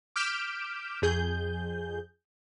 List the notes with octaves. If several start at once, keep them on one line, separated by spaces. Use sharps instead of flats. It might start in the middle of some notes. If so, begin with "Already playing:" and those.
D6 F6 G6 B6 D7 E7
F2 G#4 G6